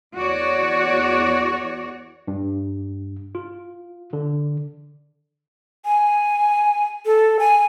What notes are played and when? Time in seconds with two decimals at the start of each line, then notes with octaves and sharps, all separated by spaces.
0.14 E2 F#4 C#5 D5
2.28 G2
3.35 F4
4.13 D3
5.85 G#5
7.06 A4
7.39 G#5